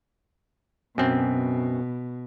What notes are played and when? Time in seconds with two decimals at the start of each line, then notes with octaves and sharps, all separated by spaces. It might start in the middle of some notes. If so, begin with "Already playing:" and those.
0.98 F#2 B2 C4